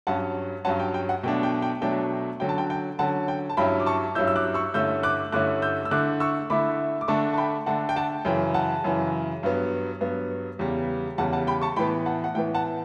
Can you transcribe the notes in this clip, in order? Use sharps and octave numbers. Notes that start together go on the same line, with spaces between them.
G2 F#3 C#4 F#5 A5
G2 F#3 C#4 F#5 A5
G5
G5
F#5
B2 F#3 A3 D4 G5
G5
G5
B2 F#3 A3 D4 G5
D3 F#3 C#4 G5
A5
G5
G5
D3 F#3 C#4 F#5 A5
G5
A5
G2 F#3 C#4 E4 G5 B5
D6
A5 C#6
G2 F#3 C#4 E4 E6 G6
E6
D6 F#6
C#6 E6
G2 D3 A3 C#4 E4 E6 G6
D6 F#6
G2 D3 A3 C#4 E4 D6 F#6
E6 G6
E6
D3 A3 E4 D6 F#6
C#6 E6
D3 A3 E4 B5 D6
D6
D3 A3 D4 A5 C#6
A5
G5 B5
D3 A3 D4 F#5 A5
G5
F#5 A5
F#2 C#3 E3 G5
F#5 A5
F#2 C#3 E3
G2 F#3 B3
G2 F#3 B3
E2 C#3 G3
E2 C#3 G3 F#5 A5
F#5 A5
G5 B5
A5 C#6
A2 E3 B3 G5 B5
F#5 A5
F#5
A2 E3 B3 G5
F#5 A5